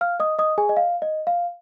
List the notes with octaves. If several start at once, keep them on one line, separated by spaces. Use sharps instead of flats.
F5 F6
D#5 D#6
D#5 D#6
G#4 G#5
D#5
F5
D#5
F5